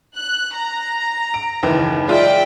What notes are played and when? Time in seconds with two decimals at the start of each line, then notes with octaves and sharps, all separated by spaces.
0.16 F#6
0.56 A#5
1.34 D7
1.63 F#1 D#2 E3
2.08 G#3 F4 D5 E5 G5